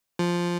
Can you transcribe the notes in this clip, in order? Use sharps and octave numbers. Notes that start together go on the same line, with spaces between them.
F3